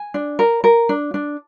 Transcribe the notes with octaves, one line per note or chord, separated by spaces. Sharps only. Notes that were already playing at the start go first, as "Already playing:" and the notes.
Already playing: G#5
D4
A#4
A#4
D4
D4